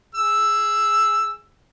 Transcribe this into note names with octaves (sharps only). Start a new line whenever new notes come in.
G#4 E6